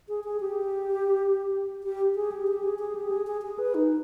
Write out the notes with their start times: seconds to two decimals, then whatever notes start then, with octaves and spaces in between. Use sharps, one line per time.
0.09 G#4
0.24 G#4
0.40 G4
1.84 G4
2.15 G#4
2.32 G4
2.48 G4
2.63 G#4
2.79 G#4
2.95 G4
3.11 G#4
3.27 G#4
3.42 G#4
3.59 B4
3.74 D#4